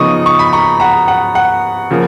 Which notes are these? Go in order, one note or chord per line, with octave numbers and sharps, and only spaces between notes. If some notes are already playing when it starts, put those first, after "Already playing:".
Already playing: C#3 F3 B3 D#4 C#6 D#6
C#6
B5
A#5 C#6
F#5 A#5
F#5
F#5
C#3 F3 A#3